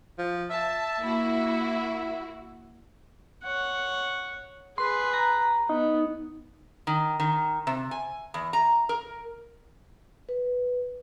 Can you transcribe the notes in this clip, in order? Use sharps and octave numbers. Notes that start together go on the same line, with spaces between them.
F3
E5 A5
A#3 E4 F#4
C#5 F#5
G#4 B4 C6
A#5
B3 D#4
D#3
D#3
C3
G#5
E2
A#5
A#4
B4